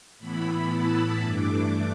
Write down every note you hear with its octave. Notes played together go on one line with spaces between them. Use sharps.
A2 E3 B3 E4 B5
A5
G2 E3 A3 D4 D6